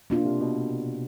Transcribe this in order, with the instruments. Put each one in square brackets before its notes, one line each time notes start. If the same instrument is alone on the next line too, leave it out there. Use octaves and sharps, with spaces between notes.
[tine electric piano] B2 [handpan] A#3 D4 F4
[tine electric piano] C3
B2